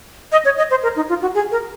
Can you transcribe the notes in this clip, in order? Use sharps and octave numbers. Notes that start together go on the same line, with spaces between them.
D#5
C#5
D#5
C5
A#4
D#4
F4
F#4
G#4
A#4